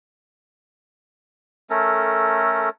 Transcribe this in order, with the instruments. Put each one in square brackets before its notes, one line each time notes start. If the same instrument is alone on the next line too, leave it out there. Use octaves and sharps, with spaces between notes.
[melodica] A3 C#4 A4 A#4